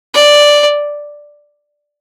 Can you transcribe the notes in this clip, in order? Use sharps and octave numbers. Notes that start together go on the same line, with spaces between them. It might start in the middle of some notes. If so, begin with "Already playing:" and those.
D5